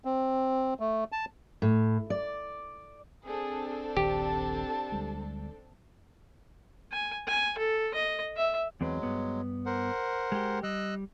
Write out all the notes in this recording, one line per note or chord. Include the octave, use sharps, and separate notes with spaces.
C4
A3
A5
A2
D5
C4 D4 G#4 A4
D#1 A#1 D#3 G4 A5
D2 G3 G#3
G#5
G#5
A4
D#5
E5
E2 F#3 G#3 C4 B4
G2 B3
A#4 C5 F#5
G#3 G4
G3 D#5 E6 F#6